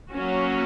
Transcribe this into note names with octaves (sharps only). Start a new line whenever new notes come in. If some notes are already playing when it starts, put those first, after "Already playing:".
F#3 A#3 C#4 F#4